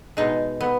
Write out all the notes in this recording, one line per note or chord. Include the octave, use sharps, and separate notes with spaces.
B2 G#3 D#4
B3